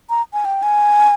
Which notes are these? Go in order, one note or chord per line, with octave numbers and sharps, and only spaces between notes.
A#5
G#5
G5
G#5